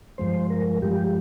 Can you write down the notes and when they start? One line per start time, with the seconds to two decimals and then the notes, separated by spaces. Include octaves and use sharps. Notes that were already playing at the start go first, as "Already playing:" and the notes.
0.18 G2 F3 G#3 C5
0.50 A#4
0.82 G2 F3 G#3 G4